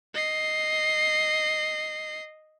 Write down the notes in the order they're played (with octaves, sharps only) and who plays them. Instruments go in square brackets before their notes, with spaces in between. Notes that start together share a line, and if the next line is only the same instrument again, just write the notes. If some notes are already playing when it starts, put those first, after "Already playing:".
[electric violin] D#5 C7